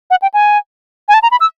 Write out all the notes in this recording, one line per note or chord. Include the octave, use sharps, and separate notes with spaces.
F#5
G5
G#5
G#5
A5
A#5
B5
E6